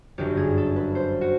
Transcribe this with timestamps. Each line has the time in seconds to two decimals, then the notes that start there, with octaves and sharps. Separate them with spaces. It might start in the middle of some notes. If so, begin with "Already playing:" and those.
0.18 G1 F#2 D3 G4
0.37 G#4
0.58 A4
0.76 B4
0.95 C5
1.21 F#4